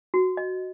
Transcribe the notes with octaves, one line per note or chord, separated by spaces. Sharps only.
F#4
D#5